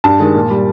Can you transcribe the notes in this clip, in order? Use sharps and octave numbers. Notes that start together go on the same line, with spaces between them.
G2 A5
D#3 G#3
A#2
G3